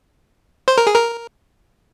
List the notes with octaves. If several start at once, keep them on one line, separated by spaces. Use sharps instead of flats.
C5
A#4
G#4
A#4